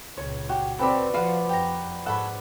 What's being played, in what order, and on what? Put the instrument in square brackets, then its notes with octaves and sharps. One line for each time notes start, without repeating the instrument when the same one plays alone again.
[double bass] C#2 A#2 [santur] C#5
[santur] F#4 [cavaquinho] G4
[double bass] C4 [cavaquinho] G4 A4 B5 [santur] B4 D5
[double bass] F3 [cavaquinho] F4 F#4 F5 [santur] B4 F#5
[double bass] F2 [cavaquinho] G4 A#5
[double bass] G#2 [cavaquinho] A4 C#5 [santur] F#5 B5